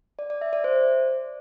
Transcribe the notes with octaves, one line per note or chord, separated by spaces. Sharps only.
D5
D5
E5
D5
C5